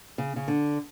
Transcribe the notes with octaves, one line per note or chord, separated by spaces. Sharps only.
C#3
C#3
D3